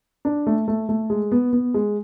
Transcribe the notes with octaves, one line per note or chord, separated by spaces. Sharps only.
D4
A3
A3
A3
G#3
B3
B3
G#3